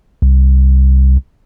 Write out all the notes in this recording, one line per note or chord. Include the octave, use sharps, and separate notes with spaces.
C2